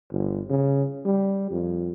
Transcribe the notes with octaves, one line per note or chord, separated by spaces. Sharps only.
G1
C#3
G3
F2